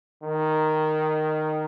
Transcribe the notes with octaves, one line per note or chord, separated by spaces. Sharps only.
D#3